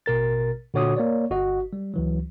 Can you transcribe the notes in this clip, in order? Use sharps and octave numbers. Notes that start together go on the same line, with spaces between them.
A1 B2 A#4 A6
A#2 D3 F#4 C#5 D6 D#6
A#3 C#5 D5
G1 F#4 D#5
G3
C#2 E3 F#3